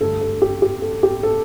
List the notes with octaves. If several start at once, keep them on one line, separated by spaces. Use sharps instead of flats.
G2 D3 A3 A4
A4
G4
G4
A4
G4
A4